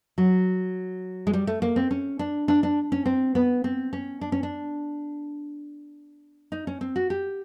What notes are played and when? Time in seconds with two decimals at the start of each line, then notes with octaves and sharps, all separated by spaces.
0.18 F#3
1.27 G#3
1.33 G3
1.47 A3
1.62 A#3
1.76 C4
1.91 C#4
2.19 D4
2.48 D4
2.63 D4
2.92 C#4
3.06 C4
3.35 B3
3.64 C4
3.93 C#4
4.21 D4
4.32 C#4
4.43 D4
6.52 D#4
6.67 C#4
6.81 C4
6.96 F#4
7.10 G4